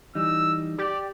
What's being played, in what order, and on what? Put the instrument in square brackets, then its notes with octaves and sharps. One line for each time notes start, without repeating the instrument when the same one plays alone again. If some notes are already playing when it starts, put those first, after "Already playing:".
[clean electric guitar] E3 G3 D#4 [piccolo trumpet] E6
[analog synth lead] G4 [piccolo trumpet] D5